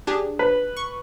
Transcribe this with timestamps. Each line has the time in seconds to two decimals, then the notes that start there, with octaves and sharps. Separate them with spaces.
0.07 D4 G4 G#4
0.39 B4
0.77 C#6